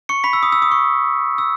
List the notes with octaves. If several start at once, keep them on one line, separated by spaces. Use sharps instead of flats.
C#6 C#7
B5 B6
E6
D#6
E6
D#6
C#6
E6